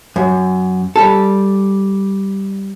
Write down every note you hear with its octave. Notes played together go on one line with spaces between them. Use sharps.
F#2
G3 A4